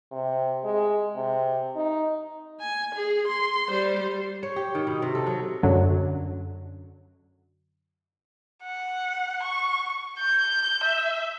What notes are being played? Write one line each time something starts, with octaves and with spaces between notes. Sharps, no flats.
C3
G#3
C3
D#4
G#5
G#4
C6
G3 C5
C#5
G4
D#3
B2
C3
A4
F#3
F#2 D3 F#3
F#5
C#6
G6
E5